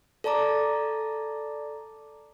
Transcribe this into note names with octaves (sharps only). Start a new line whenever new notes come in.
A4 D5 A5 A#5 D6